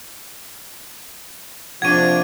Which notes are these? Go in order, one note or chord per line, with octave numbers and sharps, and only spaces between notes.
A#1 C3 F3 D4 F#5 C#6 G#6 D#7